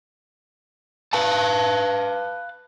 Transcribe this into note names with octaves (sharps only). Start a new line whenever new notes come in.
B4 F5 A5